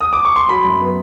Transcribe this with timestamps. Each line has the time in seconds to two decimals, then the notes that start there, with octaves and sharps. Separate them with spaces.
0.01 D#6
0.13 D6
0.25 C#6
0.36 C6
0.48 F#3 B5
0.65 F#2
0.80 B3